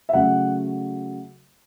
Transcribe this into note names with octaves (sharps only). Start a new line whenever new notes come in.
E5
C#3 F#3 A3 F#5